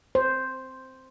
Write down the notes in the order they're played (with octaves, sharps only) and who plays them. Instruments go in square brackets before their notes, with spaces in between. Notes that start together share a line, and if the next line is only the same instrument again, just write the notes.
[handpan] C5